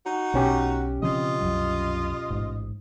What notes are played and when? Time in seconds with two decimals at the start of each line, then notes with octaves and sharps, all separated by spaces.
0.05 D#4 F#4
0.34 B1 B2 C#4 G4
1.02 C#3 F3 C4 F4 D#5
1.41 C2 F#2 F#3
2.30 A1 G#2